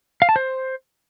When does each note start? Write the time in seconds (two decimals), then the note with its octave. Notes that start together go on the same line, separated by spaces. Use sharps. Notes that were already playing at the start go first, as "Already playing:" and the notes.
0.22 F5
0.29 A5
0.36 C5